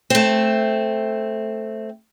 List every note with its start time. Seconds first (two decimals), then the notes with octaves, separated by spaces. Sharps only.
0.10 A3 C4